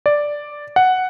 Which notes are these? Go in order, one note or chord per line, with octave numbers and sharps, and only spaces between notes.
D5
F#5